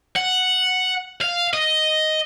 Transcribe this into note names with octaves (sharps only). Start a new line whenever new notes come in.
F#5
F5
D#5